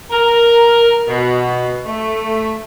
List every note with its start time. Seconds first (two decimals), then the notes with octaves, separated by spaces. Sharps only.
0.11 A#4
1.07 B2
1.86 A3